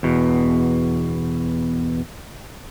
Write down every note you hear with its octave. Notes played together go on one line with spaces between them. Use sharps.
E2 B2